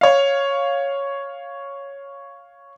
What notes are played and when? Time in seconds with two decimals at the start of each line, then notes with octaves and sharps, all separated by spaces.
0.01 C#5 F5